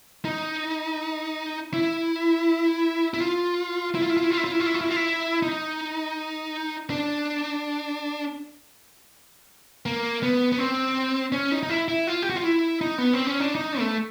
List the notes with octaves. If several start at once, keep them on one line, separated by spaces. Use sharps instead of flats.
D#4
E4
E4
F4
E4
F4
E4
F4
E4
F4
E4
F4
E4
F4
E4
F4
E4
F4
E4
D#4
D4
A#3
B3
B3
C4
C#4
D#4
D#4
E4
E4
F4
G4
F#4
F4
E4
D#4
B3
C4
C#4
D4
D#4
A3